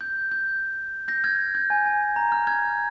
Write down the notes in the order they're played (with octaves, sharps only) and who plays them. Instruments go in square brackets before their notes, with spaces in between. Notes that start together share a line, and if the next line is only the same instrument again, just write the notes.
[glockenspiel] G6
G6
G6 A#6
F6 G#6
G6
G#5
G#5
A#5
F6
F6 G#6